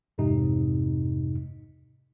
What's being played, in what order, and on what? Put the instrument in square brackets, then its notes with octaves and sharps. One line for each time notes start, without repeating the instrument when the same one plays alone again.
[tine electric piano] G#1 F2 G#2 C3 D#4